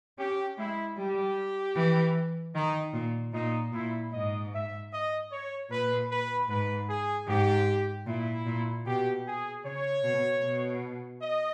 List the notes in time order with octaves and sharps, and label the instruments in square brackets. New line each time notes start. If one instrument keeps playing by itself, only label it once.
[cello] C#4 [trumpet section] G4
[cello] G#3 [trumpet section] E4
[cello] G3 [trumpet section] G4
[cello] E3
[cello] D#3 [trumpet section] D#4
[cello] A#2
[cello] A#2 [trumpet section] D#4
[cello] A#2 [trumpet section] E4
[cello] G#2 [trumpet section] D#5
[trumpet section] E5
D#5
C#5
[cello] A#2 [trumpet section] B4
[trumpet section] B4
[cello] G#2 [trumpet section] B4
[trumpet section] G#4
[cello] G#2 [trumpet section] G4
[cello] A#2 [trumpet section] E4
[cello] A#2
[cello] B2 [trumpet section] G4
[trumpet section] G#4
[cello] C#3 [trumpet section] C#5
[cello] B2
B2
[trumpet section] D#5